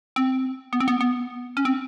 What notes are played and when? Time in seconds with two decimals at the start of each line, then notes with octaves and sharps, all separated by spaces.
0.16 C4
0.73 B3
0.80 C4
0.88 B3
1.01 B3
1.57 C#4
1.65 C4